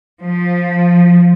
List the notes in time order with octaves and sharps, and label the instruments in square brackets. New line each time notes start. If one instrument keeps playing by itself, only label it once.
[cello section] F3